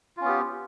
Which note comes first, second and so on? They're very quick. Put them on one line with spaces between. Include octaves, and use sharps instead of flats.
F4 C#4 B3 G4